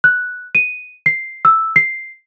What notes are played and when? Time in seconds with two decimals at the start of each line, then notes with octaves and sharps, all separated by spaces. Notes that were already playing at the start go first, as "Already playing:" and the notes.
0.04 F#6
0.55 D#7
1.06 C7
1.45 E6
1.76 C7